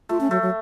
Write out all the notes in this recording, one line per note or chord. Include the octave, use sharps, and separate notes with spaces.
A3 F4
C#4
F#3 A3
F#3